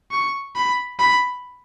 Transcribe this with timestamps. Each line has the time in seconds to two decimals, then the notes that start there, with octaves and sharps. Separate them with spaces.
0.11 C#6
0.56 B5
0.99 B5